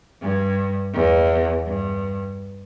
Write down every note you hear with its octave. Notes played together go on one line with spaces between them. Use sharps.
G2
E2
G2